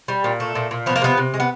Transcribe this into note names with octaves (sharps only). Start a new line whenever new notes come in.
G3
A#2
A3
A#2
A#2
F3 B3
A#3
C3 A3 B3
C3
G#3
B3